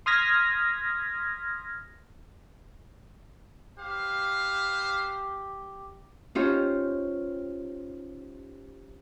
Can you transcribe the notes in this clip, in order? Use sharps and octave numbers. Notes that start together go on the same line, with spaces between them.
C6 D#6 F6 G#6 A#6 B6
G4 B4 C5 F5
C#4 D#4 F4 G4 C5 C#5